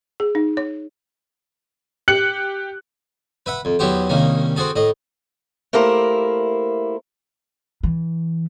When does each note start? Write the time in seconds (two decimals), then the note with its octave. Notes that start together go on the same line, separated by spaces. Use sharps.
0.20 G#4
0.35 D#4
0.57 C#5
2.08 G4 F#6 C#7 F#7
3.46 B4 E5 F#5
3.65 F2
3.79 E2 F#3 B3 G4 C5
4.09 C2 D#3 A#3 C#4
4.56 C4 F#4 G#4 A4
4.76 A2 D#5
5.73 A3 A#3 E4 G4 A#4 C5
7.83 E3